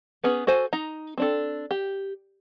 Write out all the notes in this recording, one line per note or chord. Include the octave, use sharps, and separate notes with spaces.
B3 C#4 G#4 B4
F#4 A4 C5 G#5
D#4 A#5
C4 D4 A4
G4